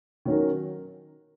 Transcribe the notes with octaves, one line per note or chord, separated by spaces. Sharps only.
D#3 F#3 C#4 F#4 A#4